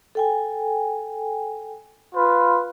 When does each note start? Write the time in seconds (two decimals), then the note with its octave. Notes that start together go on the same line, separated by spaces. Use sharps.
0.15 A4 G5 G#5
2.15 F4 B4